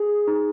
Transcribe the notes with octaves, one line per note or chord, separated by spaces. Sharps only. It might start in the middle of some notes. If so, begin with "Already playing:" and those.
Already playing: G#4
D#4